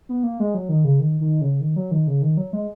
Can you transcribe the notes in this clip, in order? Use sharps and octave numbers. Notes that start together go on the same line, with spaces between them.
B3
A#3
G#3
F#3
D#3
C#3
D#3
D#3
C#3
D#3
F#3
D#3
C#3
D#3
F#3
G#3